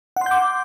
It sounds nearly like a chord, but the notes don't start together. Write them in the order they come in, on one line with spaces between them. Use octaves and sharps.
F#5 C6 G6 D6